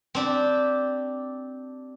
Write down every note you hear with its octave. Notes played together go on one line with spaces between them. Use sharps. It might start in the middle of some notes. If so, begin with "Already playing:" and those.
C4 D4 G4